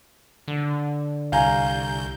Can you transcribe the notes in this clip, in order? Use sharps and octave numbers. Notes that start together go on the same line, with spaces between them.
D3
C2 F5 G#5 A#5 G6